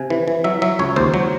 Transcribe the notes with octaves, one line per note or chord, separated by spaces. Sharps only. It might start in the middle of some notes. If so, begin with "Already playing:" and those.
Already playing: C3 G#5
E3
E3
F#3 E5
F#3 E5
C#2 C#5
D#2 C5
F#3